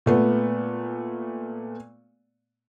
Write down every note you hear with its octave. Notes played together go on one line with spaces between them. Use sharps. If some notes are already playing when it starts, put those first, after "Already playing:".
A#2 A3 B3